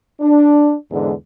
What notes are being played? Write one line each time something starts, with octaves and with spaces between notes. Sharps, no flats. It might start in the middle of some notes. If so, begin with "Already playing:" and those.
D4
E2 G#2 D3 G#3